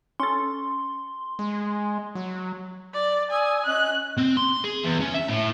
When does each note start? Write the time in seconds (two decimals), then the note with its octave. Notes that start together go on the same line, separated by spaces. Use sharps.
0.20 C#4 A4 C6
1.39 G#3
2.15 F#3
2.94 D5
3.31 D5 G#5 D#6 E6
3.66 C#4 D#5 F#6
4.18 C4
4.37 C6
4.64 G#4
4.83 E2
5.00 C#4
5.14 E5
5.28 A2